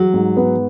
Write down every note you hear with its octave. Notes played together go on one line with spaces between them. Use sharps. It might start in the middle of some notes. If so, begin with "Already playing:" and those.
Already playing: F#3
G#2
B3